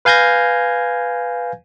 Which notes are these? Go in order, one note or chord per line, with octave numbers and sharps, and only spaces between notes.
B4 F5 G#5 G6 G#6 A#6